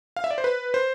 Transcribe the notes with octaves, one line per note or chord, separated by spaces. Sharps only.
F5
E5
D5
C5
B4
C5